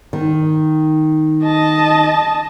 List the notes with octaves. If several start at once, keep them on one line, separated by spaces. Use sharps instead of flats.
D#3
D#5 A5